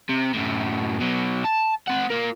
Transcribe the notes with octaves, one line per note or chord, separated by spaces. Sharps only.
C3
F#2 A2
B2 F#3
A5
C4 F#5
F4 A#4